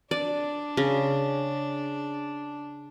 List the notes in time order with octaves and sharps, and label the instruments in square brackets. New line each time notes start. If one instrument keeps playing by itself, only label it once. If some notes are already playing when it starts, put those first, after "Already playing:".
[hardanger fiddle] D4 [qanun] D5
[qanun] C#3